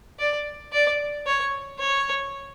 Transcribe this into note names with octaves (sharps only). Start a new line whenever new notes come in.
D5
D5
C#5
C#5